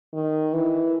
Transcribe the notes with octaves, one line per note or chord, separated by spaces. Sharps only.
D#3
E3